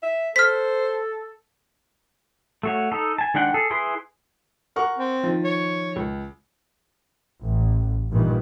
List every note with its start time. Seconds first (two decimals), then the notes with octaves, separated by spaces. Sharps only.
0.03 E5
0.36 A4 C5 F6 B6
2.63 A3 F#4 C#5
2.92 D#4 A4
3.18 G#5 A5
3.34 D#3 G#3 D4 F#5 G5
3.54 G#4 A4
3.70 E4 G#4 B4 C6
4.76 A#4 F#5 C#6
4.99 C4
5.23 D#3 F3
5.45 C#5
5.96 C#2
7.43 A1
8.10 G2 A#2 D#3 E3